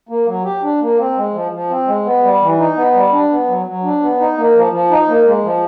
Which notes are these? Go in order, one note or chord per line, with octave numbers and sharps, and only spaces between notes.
A#3
F#3
G4
D4
A#3
C4
G#3
F3
F3
C4
G#3
B3
G3
E3
D#4
B3
G3
D4
B3
F#3
F#3
D4
B3
D#4
A#3
F3
F3
D#4
A#3
G#3
F3